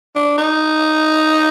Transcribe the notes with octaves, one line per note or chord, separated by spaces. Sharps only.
D4
D#4